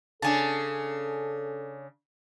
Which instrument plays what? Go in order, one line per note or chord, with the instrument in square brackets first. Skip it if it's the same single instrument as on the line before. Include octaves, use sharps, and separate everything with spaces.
[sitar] C#3 D4 [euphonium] A4 [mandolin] G#5 A5